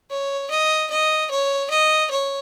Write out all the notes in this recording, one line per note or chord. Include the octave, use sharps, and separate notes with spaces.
C#5
D#5
D#5
C#5
D#5
C#5